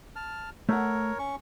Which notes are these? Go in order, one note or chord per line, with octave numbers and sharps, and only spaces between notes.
A5 F6
A3 A#4 C#5 F#5
C#4 C#6